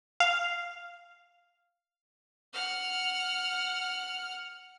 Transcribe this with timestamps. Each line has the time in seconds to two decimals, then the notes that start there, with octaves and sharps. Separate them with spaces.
0.20 F5
2.53 F#5 F6